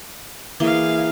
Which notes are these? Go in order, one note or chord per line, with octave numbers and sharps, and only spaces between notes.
E3 A#3 G#4 F5 C6